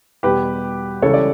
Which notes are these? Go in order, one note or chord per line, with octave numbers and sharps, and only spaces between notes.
E2 B2 G3 G4 B4
C#2 C#3 E3 G3 A4 C#5
D5